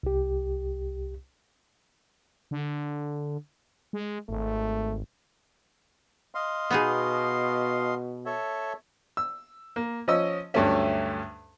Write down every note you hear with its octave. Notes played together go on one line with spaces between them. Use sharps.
C2 G4
D3
G#3
G#1 A3
D#5 F5 C6
B2 B3 D#4 G#4
A4 C#5 E5
E6
A#3
F3 C#4 D#5 E6
D2 G2 F#3 A3 C#4 E5